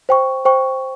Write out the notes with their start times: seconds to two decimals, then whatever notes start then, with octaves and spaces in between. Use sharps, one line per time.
0.09 C5 G5 C#6
0.45 C5 G5 C#6